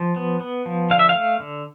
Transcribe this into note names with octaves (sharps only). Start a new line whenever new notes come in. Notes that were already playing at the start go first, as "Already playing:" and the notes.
Already playing: F3
B3
B3
F3
D3 F5
E5
F5
A3
D3